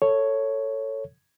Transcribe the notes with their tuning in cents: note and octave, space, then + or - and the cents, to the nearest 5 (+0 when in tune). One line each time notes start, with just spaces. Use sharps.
A4 +15 C#5 +0